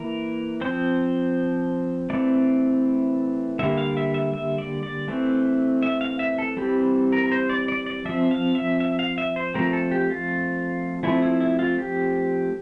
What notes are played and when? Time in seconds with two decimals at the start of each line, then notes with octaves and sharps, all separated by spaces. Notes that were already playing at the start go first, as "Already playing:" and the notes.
Already playing: E3 A#3 A#4
0.61 F3 C4 C5
2.10 E3 A3 C4 D5
3.59 D3 G3 A#3 E5
3.77 F5
3.97 E5
4.14 E5
4.34 E5
4.58 D5
4.83 D5
5.08 E3 A3 C4
5.82 E5
6.01 F5
6.19 E5
6.38 A4
6.57 E3 G3 C4 G4
7.12 A#4
7.26 A#4
7.32 C5
7.49 D5
7.68 D5
7.86 D5
8.05 F3 C4 E5
8.31 F5
8.55 E5
8.80 E5
8.99 F5
9.18 E5
9.36 C5
9.54 F3 A3 C4 A#4
9.73 A4
9.91 G4
10.10 F4
11.03 F3 A3 C4 E4
11.22 E4
11.40 E4
11.59 F4
11.78 G4